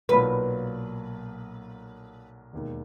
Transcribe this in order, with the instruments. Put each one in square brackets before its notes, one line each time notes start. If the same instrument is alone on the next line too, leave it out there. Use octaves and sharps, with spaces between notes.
[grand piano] B1 A#2 F#3 A#3 [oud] B4
[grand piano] E1 D#2 D#3